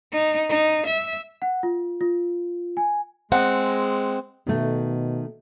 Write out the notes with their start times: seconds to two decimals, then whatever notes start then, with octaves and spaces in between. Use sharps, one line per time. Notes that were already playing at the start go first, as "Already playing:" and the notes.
0.13 D#4
0.49 D#4
0.86 E5
1.42 F#5
1.63 F4
2.01 F4
2.77 G#5
3.32 G#3 C4 F#5
4.47 B2 D#3 A3